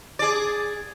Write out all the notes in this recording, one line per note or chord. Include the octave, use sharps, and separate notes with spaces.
G#4 D5